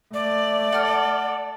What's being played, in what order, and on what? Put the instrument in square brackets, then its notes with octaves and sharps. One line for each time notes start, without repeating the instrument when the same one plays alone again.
[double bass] A3 [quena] D5
[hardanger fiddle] A4 [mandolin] F#5 F6